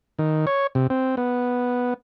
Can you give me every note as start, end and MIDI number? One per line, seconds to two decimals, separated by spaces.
0.19 0.46 51
0.47 0.67 73
0.75 0.87 48
0.90 1.15 60
1.17 1.94 59